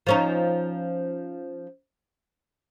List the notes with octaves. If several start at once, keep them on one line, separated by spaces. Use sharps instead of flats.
F3 C#4 D#4